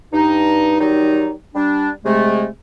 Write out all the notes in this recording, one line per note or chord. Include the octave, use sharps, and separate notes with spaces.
G2 D#4
D#3 F#3 G3 D#4
G3 D4
C3 G#3 A3